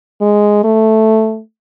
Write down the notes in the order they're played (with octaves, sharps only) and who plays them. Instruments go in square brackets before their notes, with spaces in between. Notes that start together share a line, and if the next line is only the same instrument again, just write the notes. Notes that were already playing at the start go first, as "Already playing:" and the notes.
[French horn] G#3
A3